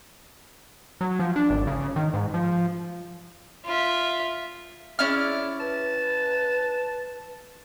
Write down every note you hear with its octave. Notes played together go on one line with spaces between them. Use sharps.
F#3
F3
D4
G#1
C#3
D#3
G#2
F3
F4 E5
C#4 E4 G#4 D5 F6
B4 A5